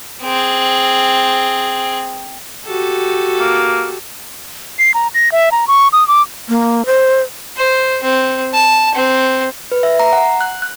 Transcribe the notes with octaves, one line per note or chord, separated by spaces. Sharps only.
C4 G#4
F#4 G4 A4
A#3
C7
A#5
A#6
E5
A#5
C#6
D#6
D6
A#3
C5
C5
C4
A5
C4
B4
E5
A#5
F#5
F#6
F#6